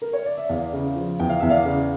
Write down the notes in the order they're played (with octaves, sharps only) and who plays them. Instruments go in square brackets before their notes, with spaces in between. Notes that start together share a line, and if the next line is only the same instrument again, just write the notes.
[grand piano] A#4
C#5
D5
E5
E2 D5 F5
C#3
F3
E2 G5
F5
E2 E5
D5 F5
C#3